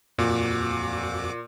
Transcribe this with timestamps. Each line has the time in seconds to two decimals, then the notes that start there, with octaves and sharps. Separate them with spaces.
0.18 F2 A#2 F#4 D6